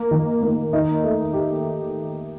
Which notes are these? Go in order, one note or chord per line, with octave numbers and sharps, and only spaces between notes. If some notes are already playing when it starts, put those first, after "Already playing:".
Already playing: A#3
D#3
A#3
D#4
A3
G4